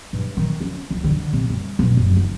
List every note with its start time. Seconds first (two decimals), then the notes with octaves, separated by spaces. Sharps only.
0.13 G2
0.37 D#3
0.61 C#4
0.90 C#2
1.04 D3
1.33 C3
1.50 G2
1.79 E1
1.97 F#1
2.17 D#4